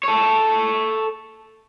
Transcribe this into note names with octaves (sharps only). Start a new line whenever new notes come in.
A4 C#5